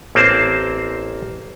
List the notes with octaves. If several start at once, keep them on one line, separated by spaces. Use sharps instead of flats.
A1 A#3 C4 C5 A5